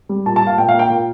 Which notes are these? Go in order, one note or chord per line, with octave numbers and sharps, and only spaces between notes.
G3
A#2 A5
A5
A#2 F5
A#2 G5
F5
A#3
G5
A#2